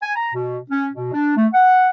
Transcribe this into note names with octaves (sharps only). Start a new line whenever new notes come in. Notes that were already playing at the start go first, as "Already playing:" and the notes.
G#5
A#5
B2
C#4
B2
D4
A3
F#5